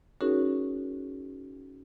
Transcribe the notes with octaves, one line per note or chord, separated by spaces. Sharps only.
C#4 D#4 F#4 G#4 A#4 C#5